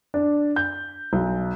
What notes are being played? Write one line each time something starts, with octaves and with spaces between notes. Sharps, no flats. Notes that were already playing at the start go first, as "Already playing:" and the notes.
D4
G6
B1